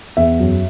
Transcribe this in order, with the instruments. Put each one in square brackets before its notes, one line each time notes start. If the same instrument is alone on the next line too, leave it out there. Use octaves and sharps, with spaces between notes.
[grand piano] E2 E5
F#2